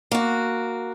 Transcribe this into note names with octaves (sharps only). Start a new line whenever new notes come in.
A#3 F#4